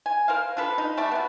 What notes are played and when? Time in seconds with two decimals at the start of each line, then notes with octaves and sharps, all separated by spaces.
0.06 G#5
0.28 A#4 C5 F5
0.57 D4 F4 A4 B4
0.78 D#4
0.97 G3 A3 D5 A5
1.12 B3 F#4